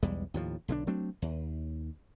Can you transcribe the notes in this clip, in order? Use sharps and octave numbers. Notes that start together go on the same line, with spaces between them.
B1 E2 G3 G#3
D#2 A2 F3
B1 D3 C4 D4
F#3 A3 C4 D4
D#2